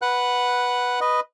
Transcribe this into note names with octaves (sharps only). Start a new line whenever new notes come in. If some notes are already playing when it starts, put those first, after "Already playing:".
B4 F#5 F#6
B4 D#5